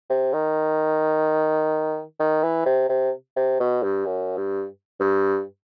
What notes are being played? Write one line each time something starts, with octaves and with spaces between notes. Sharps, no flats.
C3
D#3
D#3
E3
C3
C3
C3
B2
G2
F#2
G2
G2